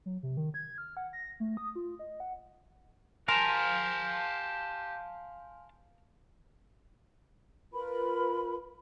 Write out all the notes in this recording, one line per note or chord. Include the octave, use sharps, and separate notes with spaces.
F#3
C3
D#3
G#6
F6
F#5
A#6
A3
D#6
F4
D#5
F#5
G4 A#4 F5 G#5 A5 C6 F6
F4 A#4 B4 B5